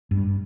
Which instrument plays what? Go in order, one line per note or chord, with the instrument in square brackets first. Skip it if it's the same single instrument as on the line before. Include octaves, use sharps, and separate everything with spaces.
[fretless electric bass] G2